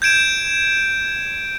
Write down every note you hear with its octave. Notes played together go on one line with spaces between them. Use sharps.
G6 G#6 D7 E7